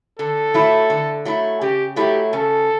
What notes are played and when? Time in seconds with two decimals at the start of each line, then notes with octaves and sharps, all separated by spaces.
0.19 D3 A4
0.54 F#3 A3 E4
0.90 D3
1.25 F#3 A3 E4
1.61 C#3 G4
1.96 F#3 A3 E4 G4
2.32 C#3 A4